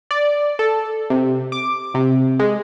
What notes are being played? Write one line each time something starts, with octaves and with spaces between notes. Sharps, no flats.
D5
A4
C3
D6
C3
G#3